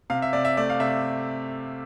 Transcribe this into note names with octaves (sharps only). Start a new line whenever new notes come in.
C3 F5
E5
C3 D5
E5
A3 D5
F5
C3 E5